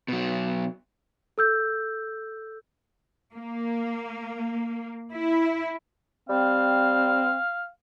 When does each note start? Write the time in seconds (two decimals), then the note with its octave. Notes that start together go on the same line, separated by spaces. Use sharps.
0.08 B2 F#3
1.38 A4 E6 G6
3.34 A#3
5.13 E4
6.29 G3 C4 F5